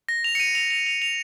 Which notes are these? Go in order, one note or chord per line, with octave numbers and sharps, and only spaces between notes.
A#6
F7
C#7
D#7
F7
F7
F7
F7